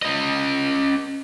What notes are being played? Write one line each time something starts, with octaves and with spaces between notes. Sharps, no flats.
C#4 D#5